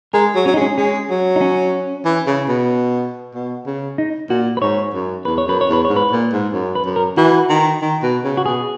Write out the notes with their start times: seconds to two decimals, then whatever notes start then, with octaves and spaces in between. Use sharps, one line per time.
0.14 G#3 A#4
0.35 F#3
0.46 F#3 C#4
0.54 D#4
0.56 G#3 C#4
0.78 G#3 C#4
1.10 F#3
1.36 D#4
1.41 C#4
2.05 E3
2.27 C#3
2.49 B2
3.34 B2
3.66 C#3
3.98 D#4
4.29 A#2 F#4
4.57 B4
4.61 G#2 C#5
4.94 F#2
5.25 E2 B4
5.38 C#5
5.47 F#2 B4
5.61 C#5
5.69 E2 B4
5.85 G#2 C#5
5.96 B4
6.11 A#2
6.33 G#2
6.53 F#2
6.75 B4
6.86 F#2
6.96 A#4
7.17 E3 F#4
7.50 D#3
7.82 D#3
8.03 B2
8.24 C#3
8.37 F#4
8.46 B2 G#4